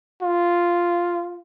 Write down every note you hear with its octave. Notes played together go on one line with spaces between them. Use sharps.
F4